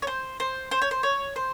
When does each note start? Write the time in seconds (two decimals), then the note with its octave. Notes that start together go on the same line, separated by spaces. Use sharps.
0.02 C#5
0.07 C5
0.40 C5
0.71 C5
0.82 C#5
0.91 C5
1.03 C#5
1.36 C5